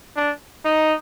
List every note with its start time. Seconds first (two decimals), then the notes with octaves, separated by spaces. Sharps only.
0.16 D4
0.65 D#4